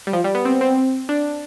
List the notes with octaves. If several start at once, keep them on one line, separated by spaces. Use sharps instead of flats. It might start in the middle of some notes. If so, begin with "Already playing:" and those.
G3
F3
G3
B3
C4
C4
D4